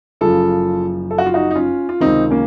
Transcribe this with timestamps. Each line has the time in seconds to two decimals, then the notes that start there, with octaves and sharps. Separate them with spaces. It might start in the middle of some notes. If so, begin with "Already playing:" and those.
0.21 F#1 F#2 C#3 F3 F4 A4
1.11 A4
1.18 F#4
1.26 F4
1.34 D#4 F#4
1.51 D#4
1.55 C#4 F4
1.89 F4
2.00 C#2 C3 D#3 C4 D#4
2.30 A#3 C#4